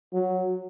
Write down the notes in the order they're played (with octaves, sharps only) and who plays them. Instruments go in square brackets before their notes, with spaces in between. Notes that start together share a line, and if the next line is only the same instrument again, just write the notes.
[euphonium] F#3